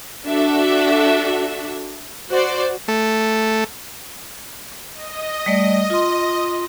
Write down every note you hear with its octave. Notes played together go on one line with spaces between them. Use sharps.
D4 F#4 A4 E5
F#4 C5 D5
A3
D#5
G3 A3 D5
F4 C6